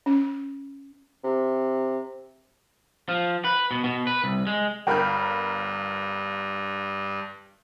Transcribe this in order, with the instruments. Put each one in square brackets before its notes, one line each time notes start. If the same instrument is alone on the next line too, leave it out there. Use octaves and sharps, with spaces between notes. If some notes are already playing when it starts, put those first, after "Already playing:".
[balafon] C#4
[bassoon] C3
[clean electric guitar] F3
B4
B2
B2
B4
C2
G#3
[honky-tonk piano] G1 A#4 B5 [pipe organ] G2 [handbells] G5 G6